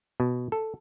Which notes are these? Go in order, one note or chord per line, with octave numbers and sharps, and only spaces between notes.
B2
A4